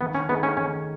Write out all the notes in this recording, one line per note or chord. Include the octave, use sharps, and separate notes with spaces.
D#3 B3
C#4
A3 B3 D#4 G#4
C#4
D#3 C#4